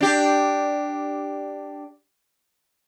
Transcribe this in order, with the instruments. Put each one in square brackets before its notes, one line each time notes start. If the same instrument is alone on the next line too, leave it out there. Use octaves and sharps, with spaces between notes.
[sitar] D4 G4